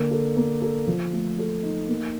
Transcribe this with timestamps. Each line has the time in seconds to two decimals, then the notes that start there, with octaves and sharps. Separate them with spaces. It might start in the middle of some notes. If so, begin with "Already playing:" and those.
Already playing: D3 A#3
0.11 A4
0.37 A#3
0.62 A4
0.87 F3
1.13 A3
1.38 A4
1.63 D#4
1.88 A#3